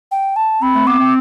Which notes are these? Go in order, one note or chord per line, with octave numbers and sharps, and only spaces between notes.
G5
A5
C4 B5
A3
B3 D6
C4